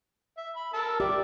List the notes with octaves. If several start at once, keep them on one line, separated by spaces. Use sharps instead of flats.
E5
B5
A#4 A5 E6
G4 D5 E5 D6